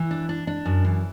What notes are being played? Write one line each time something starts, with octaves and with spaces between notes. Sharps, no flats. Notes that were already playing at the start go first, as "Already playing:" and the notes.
Already playing: E3
D4
D4
D4
F#2
E3